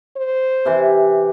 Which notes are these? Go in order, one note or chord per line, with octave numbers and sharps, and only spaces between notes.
C5
C3 E3